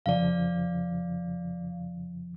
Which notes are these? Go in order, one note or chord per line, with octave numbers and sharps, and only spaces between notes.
F2 C#3 F3 D5 F5